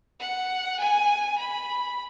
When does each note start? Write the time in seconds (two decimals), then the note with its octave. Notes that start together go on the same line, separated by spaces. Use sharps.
0.20 F#5
0.80 G#5
1.38 B5